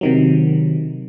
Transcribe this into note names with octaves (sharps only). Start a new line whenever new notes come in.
C3 D#3 F#3